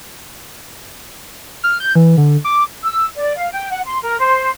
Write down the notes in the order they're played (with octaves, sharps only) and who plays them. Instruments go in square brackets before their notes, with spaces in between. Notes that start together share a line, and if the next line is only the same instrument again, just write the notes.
[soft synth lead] F6
G6
E3
D3
D6
[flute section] E6
D5
F5
G5
F#5
C6
A#4
C5